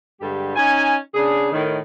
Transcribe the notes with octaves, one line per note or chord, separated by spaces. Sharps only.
G2 D3 G#3 G4 A4
C#4 D#4 G#5
C#3 D4 G#4
A2 D#3